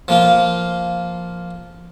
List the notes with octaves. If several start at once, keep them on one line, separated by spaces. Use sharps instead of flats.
F3 A#3 F4